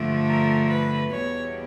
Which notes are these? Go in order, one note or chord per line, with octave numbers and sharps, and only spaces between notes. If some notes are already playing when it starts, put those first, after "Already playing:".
Already playing: G2 D3 F3 A3
A#4
B4
E2 B2 G3 B3 C#5